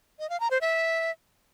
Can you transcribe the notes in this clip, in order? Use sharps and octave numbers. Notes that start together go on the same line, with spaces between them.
D#5
F5
A#5
C5
E5